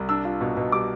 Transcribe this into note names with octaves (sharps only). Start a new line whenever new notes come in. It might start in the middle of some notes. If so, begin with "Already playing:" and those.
Already playing: C2
D4 E6
F4
B2
B2
G3 D6